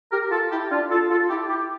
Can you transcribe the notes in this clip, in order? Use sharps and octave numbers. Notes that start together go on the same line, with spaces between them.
G4 A#4
F4 A4
E4 G4
D4 F4
F4 A4
F4 A4
E4 G4
E4 G4